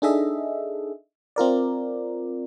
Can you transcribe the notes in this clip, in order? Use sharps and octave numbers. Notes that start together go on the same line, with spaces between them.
D4 D#4 G#4 A4 D#5 E5
C4 F4 A#4 D5